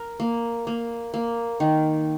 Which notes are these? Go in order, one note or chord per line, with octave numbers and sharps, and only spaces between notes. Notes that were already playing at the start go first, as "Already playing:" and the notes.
Already playing: A#4
A#3
A#3
A#3
D#3